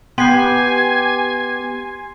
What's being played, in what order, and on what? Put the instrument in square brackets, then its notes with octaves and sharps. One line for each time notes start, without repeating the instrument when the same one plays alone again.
[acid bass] B3 [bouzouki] G4 [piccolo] G#5 [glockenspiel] C6 C7